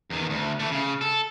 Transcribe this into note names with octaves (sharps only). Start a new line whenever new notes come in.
E2 D#3
D2
E3 A3
C#3
A4